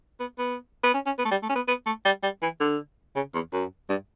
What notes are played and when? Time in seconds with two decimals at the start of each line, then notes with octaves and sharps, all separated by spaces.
0.20 B3
0.38 B3
0.84 B3
0.94 C#4
1.06 C#4
1.19 B3
1.25 A3
1.31 G3
1.43 A3
1.49 C#4
1.56 B3
1.68 B3
1.86 A3
2.05 G3
2.23 G3
2.42 E3
2.60 D3
3.16 C#3
3.34 E2
3.53 F#2
3.89 G2